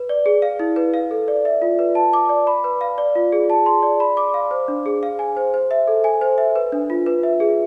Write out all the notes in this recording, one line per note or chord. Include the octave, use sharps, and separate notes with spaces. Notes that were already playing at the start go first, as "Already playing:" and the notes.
Already playing: B4
D5
G#4
F5
E4
B4
F5
A4
D5
E5
F4
B4
A5
D6
D5
B5
B4
F5
D5
F4
G#4
A5
C6
D5
B5
D6
F5
C5
D4
G#4
F5
G#5
C5
C5
E5
A4
G#5
C5
E5
B4
D4
F4
B4
E5
G#4